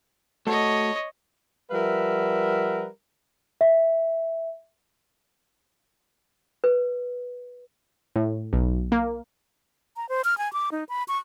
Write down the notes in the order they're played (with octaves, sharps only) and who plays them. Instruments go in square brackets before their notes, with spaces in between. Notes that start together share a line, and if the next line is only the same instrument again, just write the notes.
[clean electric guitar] A3 F#4 A4 [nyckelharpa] C#5 D#5
[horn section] F3 G3 A#4 B4 E5 F#5
[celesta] E5
[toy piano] B4
[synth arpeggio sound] A2
B1
A#3
[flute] A#5
C5
F6
G#5
D6
D#4
B5
C#6